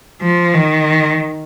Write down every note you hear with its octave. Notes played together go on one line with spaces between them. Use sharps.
F3
D#3